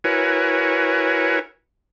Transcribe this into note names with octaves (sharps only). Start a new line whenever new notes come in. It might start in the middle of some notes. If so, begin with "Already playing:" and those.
E4 F#4 A#4 B4 C#5 G#5